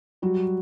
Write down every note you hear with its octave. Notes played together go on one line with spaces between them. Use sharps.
F#3 G3 F#4